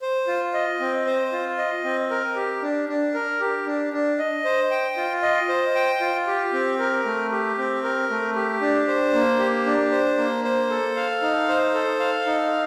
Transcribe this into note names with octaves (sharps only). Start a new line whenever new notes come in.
C5
F4
D#5
C4
C5
F4
D#5
C4
A#4
G4
D4
D4
A#4
G4
D4
D4
D#5
C5
G5
F4
D#5
C5
G5
F4
G4
C4
A#4
A3
G4
C4
A#4
A3
G4
D4
C5
A#3
G4
D4
C5
A#3
C5
A4
F5
D#4
C5
A4
F5
D#4